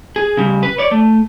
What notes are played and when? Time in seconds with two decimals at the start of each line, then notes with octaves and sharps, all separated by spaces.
0.16 G#4
0.37 C#3 G3
0.63 B4
0.78 C#5 D5
0.91 A3